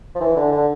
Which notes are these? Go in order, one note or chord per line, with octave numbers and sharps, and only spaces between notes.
F3
E3
D3
D3